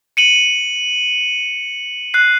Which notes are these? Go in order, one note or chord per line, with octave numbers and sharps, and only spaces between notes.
C#7 D#7 F#7
F#6 C7